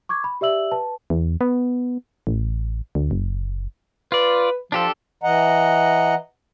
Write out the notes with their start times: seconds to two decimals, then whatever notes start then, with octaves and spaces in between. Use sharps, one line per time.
0.09 C#6 D6 G#6
0.24 B5
0.41 G4 D5 E5 E6 F#7
0.71 B4 A5
1.10 E2
1.41 B3
2.27 A1
2.95 D2
3.11 F#1
4.12 F4 B4 D5
4.72 F3 D4 G4 A4
5.23 E3 D#5 F#5 A#5